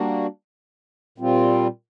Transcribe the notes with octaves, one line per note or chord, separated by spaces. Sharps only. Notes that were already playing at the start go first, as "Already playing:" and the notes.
Already playing: G3 A#3 D4 F#4
A#2 G3 C4 F4